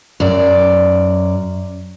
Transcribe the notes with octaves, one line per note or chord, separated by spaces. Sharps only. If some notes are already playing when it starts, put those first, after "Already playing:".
F#2 D5